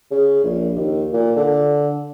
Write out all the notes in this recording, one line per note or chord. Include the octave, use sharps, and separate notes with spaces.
C#3
A#1
D#2
A#2
D3